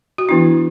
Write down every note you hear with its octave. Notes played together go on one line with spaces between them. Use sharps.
F#4
E3 B3 D4 E4